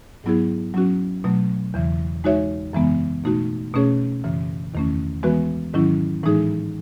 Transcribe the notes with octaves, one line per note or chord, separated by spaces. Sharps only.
G#2 F#3 B3 E4 G#4
F#3 C#4 F#4
B2 F#3 A3
E2 C#3 E3
G#3 D#4 F#4 C#5 E5
F#2 C#3 E3 G#3 B3
B2 A3 D#4 F#4
B2 A3 C#4 G#4 C#5
F#2 C#3 E3
E2 D#3 A3 C#4
E3 G#3 B3 F#4 B4
G#2 D#3 F#3 C#4 E4
A2 E3 G#3 D#4 G#4